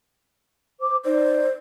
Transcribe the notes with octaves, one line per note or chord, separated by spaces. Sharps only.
C5 D6
D#4 C5 D5